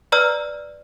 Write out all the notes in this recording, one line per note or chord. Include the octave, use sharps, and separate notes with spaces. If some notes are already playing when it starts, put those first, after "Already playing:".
B4 D5 A#5 E6 F6